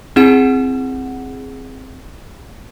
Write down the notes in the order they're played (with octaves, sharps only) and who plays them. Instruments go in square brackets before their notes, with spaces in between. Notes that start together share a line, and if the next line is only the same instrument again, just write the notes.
[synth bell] C4 E4 G#4 F#5 E7